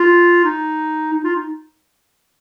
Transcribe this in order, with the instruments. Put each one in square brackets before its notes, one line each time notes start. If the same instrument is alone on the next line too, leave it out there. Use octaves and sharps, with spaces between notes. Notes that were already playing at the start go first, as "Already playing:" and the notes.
Already playing: [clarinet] F4
D#4
D#4
F4
D#4